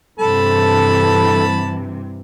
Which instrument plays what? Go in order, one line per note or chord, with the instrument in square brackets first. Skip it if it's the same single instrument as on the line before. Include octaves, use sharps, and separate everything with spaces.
[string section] G2 C3 E3 [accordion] A4 [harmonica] A5 B5